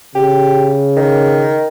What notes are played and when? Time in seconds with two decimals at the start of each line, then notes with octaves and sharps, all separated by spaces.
0.15 C#3 G4
0.96 D#3